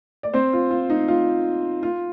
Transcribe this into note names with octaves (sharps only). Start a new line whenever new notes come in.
D5
C4 C5
F4
F4
D#4
F4
F4